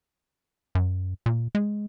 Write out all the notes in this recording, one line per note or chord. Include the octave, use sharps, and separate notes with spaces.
F#2
A#2
G#3